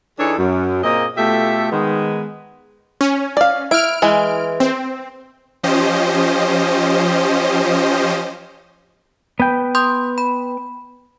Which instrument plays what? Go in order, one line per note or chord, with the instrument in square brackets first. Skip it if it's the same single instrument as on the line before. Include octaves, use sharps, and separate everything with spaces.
[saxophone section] E3 D4 D#4 G#4 A4 C#5
F#2
A#2 A#3 C4 G#4 D#5
B2 A3 F4 G4 A4 E5
D#3 G#3 B3
[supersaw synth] C#4
[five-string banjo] D5 F5
[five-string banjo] E4 [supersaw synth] F6 D7
[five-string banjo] E3 G#3
[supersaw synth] C4
F3 C#4 G4 C5 D#5
[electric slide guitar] B3 B4 G5
[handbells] C6 D#6 G6
B5